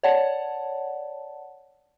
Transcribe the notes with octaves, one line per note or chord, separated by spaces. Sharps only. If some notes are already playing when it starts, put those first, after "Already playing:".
C#5 D5 F#5 A5